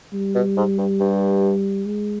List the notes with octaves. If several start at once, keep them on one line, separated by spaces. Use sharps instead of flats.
G3
B2
G#2
G2
G2
G#3